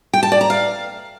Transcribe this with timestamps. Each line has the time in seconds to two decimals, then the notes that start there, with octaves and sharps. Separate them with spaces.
0.13 G5
0.23 A5
0.32 D5
0.41 A#5
0.50 F5